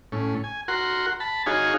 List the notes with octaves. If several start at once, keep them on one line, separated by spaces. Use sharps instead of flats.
A2 C#4
G#5
F#4 A#4 F#5 C6
A5 B5
D#4 F#4 G#4 C#5 F5 G#5